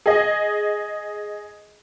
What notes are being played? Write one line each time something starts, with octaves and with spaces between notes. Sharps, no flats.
G#4 D#5